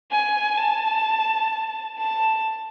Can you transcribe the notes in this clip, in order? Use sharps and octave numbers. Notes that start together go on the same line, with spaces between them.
G#5
A5
A5